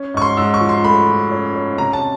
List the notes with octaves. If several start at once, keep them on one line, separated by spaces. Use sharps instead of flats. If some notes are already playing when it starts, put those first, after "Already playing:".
Already playing: C#4
G#2 C#6
C6
G#2 E6
C#6
F3
C6
A3 B5
F3
C#4
C#4
C3 A#5
A5